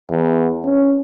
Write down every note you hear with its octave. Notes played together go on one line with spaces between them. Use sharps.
E2
C#4